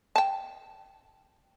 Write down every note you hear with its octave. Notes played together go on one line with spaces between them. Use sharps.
G5 A5